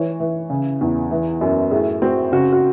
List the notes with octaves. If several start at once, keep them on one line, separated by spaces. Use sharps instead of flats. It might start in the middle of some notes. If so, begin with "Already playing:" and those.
Already playing: E3 C#5
E3
C#3
E2
E3
F#2
A2 G#4
C4 F#4
C#3 F#4
F#4